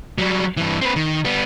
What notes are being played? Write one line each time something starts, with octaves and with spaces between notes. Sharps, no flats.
F#3 G3
G2 E3
C4 B4
D#3
G3 B3